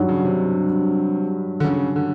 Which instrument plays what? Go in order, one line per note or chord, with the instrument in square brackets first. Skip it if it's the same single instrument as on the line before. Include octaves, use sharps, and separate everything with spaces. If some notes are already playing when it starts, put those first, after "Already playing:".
Already playing: [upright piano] G2 D#3 F#3
[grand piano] C#3
C3
D3
C#3
D3